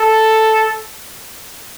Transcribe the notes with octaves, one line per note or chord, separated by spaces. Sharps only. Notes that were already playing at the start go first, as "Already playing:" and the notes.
Already playing: A4